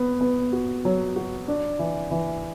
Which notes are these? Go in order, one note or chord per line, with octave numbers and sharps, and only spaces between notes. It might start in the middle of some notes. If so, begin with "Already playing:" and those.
Already playing: B3
B3
F#4
F#3
F#4
D4
E3
E3